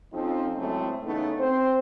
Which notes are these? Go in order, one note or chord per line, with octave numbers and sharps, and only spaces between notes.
F2 F3 C4 C#4 D#4 A4
F#2 A2 C#3 G#3 A3 C4
E2 C#3 A3 B3 D#4
C4 C5